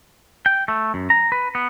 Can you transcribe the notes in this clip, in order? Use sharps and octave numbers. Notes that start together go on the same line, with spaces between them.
G5
A3
F#2
A#5
B4
B3